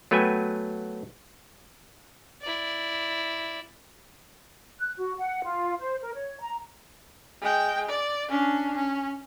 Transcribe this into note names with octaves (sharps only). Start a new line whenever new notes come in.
F#3 A3 B3 B4 G5 G#5
E4 D5
F#6
F#4
F#5
F4
C5
A#4
C#5
A#5
G#3 G5
D5
C#4 D4
C#4